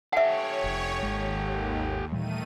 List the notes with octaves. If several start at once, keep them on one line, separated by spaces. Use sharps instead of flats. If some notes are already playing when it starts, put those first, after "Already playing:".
G4 A4 C#5 E5 F#5
F1 F2
G#1 D#2 G#3
A#2 D#3 E3 G3 A3 D#7